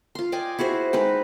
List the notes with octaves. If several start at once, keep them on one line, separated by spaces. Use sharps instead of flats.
F4 C6
D5 D#5 G5 G#5
E4 F#4 G#4 C5
G#3 D#4 B4 G5